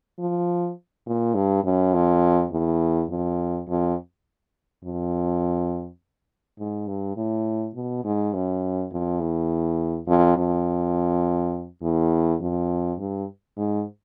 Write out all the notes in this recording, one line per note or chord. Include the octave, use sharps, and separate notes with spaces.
F3
A#2
G2
F#2
F2
E2
F2
F2
F2
G#2
G2
A2
B2
G#2
F#2
F2
E2
F2
F2
E2
F2
G2
G#2